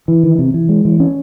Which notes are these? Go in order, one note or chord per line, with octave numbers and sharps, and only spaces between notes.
E3
D#3
C3
E3
G#3
E3
C#4